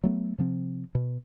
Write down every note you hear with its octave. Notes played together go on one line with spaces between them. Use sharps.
F#3 A3 B3
C3 F3 C4
B2